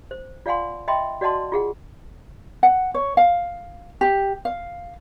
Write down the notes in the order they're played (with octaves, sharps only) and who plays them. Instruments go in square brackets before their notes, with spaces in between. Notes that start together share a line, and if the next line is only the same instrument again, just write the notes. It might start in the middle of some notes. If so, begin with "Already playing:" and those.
[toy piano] C5
F4 D5 F5 F#5 G#5 C6
D#5 E5 G5 B5 C6
F#4 D5 D#5 F#5 A5 C6
F4 G#4 F#5
[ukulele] F#5
C#5
F5
G4
F5